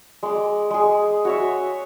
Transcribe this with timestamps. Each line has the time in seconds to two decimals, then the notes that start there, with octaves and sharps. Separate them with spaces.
0.23 G#3 D6
0.70 G#3 G#4
1.25 F#4 C#5 E5